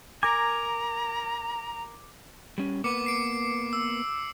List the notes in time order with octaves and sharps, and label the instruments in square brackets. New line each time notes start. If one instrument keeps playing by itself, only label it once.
[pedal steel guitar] A#4 G#5 [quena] A#5 [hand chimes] D6
[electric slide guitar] G3 C#4
[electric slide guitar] A#3 B3 B4 [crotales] D6 C#7
[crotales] C7 D7
E6